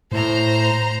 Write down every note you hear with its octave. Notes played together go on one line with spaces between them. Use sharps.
A2 C5 A#5